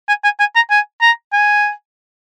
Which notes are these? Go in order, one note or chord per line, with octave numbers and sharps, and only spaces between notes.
G#5
G#5
G#5
A#5
G#5
A#5
G#5